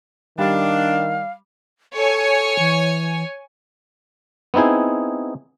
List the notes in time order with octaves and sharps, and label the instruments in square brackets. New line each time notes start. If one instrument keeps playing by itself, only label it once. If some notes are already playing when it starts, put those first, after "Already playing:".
[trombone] D#3 [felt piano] G3 [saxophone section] D4 [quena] F5
[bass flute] A4 [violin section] C#5 G#5
[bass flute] E3
[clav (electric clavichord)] B3 C4 D#4 E4 G#4